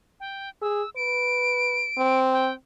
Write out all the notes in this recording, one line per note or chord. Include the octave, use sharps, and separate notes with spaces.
G5
G#4 E6
B4 D7
C4
G5